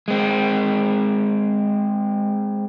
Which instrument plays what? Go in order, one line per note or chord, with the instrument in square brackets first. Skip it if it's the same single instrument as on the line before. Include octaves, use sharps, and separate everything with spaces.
[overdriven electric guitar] G#3 C4